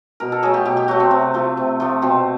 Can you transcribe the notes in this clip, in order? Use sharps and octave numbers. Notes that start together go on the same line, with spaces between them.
B2 A#4
A4
F#3 A3 G#4
G4
B2 G4
G4
F#3 A3 F#4
C4
C3
F3 A3
C3
F3 A3
B2 C4